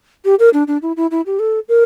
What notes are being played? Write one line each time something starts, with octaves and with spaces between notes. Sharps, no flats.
G4
A#4
D4
D4
E4
E4
E4
G4
A4
A#4